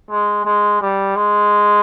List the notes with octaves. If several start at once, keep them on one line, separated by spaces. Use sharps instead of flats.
G#3
G#3
G3
G#3